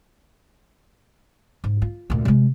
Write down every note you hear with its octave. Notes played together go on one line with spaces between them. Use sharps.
G#2
F4
D2 A#2
C3 G#3